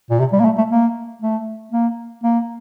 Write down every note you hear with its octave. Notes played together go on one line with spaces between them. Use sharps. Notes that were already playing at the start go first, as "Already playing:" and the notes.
A#2
C3
G3
A#3
A3
A3
A#3
A3
A#3
A#3